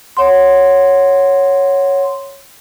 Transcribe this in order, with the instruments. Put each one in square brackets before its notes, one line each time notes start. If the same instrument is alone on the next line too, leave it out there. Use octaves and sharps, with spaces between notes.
[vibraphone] C#5 F#5 C6